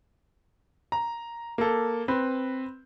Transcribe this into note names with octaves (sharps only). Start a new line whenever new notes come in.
A#5
A#3 A4
C4 B4